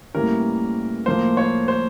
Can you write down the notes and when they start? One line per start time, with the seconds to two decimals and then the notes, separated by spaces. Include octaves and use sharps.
0.14 A2 E3 G3 A#3 C#4 A#4
1.06 A2 F3 A#3 C5
1.37 C#5
1.68 C5